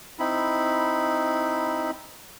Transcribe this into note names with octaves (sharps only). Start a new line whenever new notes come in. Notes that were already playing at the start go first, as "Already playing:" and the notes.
C4 D#4 E4 B5